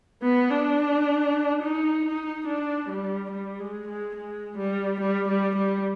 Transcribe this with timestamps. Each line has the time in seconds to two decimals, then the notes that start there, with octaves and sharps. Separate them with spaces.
0.22 B3
0.51 D4
1.62 D#4
2.05 D#4
2.47 D4
2.89 G3
3.31 G3
3.59 G#3
3.88 G#3
4.15 G#3
4.58 G3
5.00 G3
5.28 G3
5.56 G3